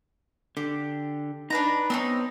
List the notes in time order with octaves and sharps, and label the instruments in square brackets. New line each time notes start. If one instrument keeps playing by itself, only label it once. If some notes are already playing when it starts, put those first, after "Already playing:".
[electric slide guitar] D3 [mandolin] G4
[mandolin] D4 B4 A#5 [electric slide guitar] D#4
[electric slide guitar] B3 C#5 [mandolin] C4 D4 D#4